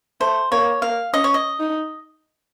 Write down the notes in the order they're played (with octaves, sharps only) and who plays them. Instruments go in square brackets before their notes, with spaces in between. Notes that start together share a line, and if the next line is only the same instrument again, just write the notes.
[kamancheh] A3 [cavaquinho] C5
[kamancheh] A#3 [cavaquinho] C#5
[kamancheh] A#3 [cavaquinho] F5
[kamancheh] C#4 [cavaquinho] D#5
[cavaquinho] C#5
D#5
[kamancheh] D#4